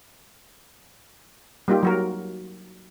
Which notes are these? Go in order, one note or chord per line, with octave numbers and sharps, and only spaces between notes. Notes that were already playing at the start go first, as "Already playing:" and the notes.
G3 A#3 D#4 F4 G4
F#3 F#4 A#4